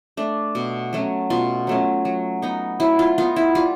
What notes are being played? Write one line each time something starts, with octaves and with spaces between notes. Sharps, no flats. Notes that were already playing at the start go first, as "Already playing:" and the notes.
A3 D4
B2
F#3 A3 C#4
B2 F4
F#3 A3 C#4
F#3
B3 D#4
F#3 E4
F4
B3 D#4 F4
E4
G3 F4